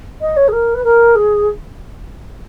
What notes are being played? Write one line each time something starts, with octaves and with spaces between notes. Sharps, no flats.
D#5
C#5
G#4
A#4
B4
A#4
G#4